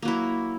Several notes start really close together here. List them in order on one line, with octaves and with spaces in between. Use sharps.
A#3 F#3 E4